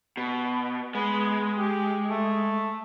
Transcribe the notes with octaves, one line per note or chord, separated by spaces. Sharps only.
B2
G#3 B3
G4
A3